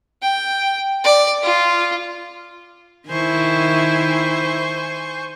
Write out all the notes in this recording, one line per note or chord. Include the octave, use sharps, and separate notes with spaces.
G5
D5
F4
D#3 E4 C5 G#5 C#6